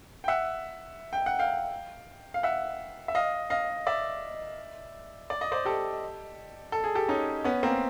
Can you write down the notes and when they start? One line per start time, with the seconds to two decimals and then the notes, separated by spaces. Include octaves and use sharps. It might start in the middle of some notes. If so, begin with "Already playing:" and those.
0.24 G5
0.28 E5 F#5
1.13 G5
1.26 F#5
1.39 F5 G5
2.34 F5
2.43 E5 F#5
3.08 E5
3.15 D#5 F5
3.50 D#5 F5
3.87 D5 E5
5.30 D5
5.41 D#5
5.52 C5 D5
5.65 G4 A4
6.72 A4
6.84 G#4
6.95 G4 A4
7.08 C#4 D#4
7.44 B3 C#4
7.63 A#3 C4